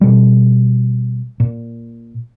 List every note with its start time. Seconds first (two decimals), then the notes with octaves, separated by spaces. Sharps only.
0.01 B2 G3
1.40 A#2